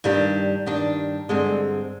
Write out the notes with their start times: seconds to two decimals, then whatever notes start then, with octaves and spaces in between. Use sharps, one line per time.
0.04 G2 D#3 G3 D4
0.66 G2 D#3 G3 D4
1.29 G2 D3 G#3 C4